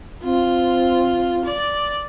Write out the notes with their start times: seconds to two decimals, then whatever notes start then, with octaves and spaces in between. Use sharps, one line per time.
0.24 C4 F4
1.45 D5